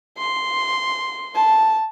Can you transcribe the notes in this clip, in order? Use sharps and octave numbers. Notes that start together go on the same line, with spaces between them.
C6
A5